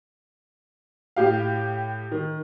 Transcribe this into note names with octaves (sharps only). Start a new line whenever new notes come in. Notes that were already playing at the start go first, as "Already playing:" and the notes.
A2 G4 F5
D#3